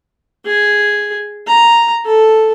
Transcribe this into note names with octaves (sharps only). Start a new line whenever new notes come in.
G#4
A#5
A4